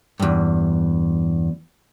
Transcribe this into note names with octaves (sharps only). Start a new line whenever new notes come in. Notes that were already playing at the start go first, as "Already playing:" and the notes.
E2 G2